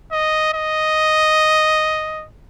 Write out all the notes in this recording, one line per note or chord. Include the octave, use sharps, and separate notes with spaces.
D#5
D#5